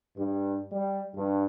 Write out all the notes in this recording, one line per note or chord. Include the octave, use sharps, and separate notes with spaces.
G2
G3
G2